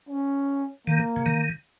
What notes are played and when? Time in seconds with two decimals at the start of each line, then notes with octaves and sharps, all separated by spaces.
0.09 C#4
0.87 D#3 A#3
1.16 C#3
1.26 D#3